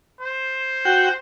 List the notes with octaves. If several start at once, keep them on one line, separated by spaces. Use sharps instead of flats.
C5
F#4 G5